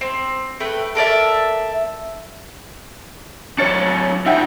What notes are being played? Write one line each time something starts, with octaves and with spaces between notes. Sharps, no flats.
C4
A3 B4 G5
A4 A#4 D5 E5
F#3 D4 C#5 A6 C#7
D#4 F4 E5 F#5 G5